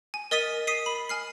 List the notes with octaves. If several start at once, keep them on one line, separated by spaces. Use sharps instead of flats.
G#5
A#4 D#5 D#6 A6 B6 D#7
D#6 B6 C7 D#7
B5
G#5 F6 C7